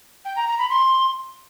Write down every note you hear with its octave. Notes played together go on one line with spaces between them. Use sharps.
G5
A#5
A#5
B5
C6